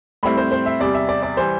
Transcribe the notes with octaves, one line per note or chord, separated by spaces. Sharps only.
A2 G3 C4 E4 B5
C5
C5
E5
E2 C3 G3 D5
E5
D5
D5
E3 G3 C5